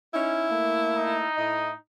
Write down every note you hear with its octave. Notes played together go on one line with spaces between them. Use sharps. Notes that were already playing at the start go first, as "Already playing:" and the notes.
C#4 D#4 E4
A3 A#3
D#4
A2 E4 D#5